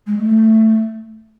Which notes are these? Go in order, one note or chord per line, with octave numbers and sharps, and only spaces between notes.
G#3
A3